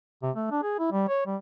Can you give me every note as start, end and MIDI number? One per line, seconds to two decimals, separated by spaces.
0.23 0.31 48
0.36 0.48 57
0.51 0.61 62
0.63 0.77 68
0.79 0.87 64
0.92 1.06 55
1.08 1.23 73
1.26 1.36 55